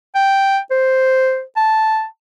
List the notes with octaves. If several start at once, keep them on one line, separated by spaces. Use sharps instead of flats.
G5
C5
A5